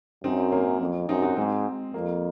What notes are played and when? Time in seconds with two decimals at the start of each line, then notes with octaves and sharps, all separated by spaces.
0.24 F#2 C4 D#4
0.52 A#3 C#4
0.80 F2
1.08 F#2 C4 D#4
1.22 D#4 F#4
1.37 G#2 G#3 C4
1.94 F2 A#3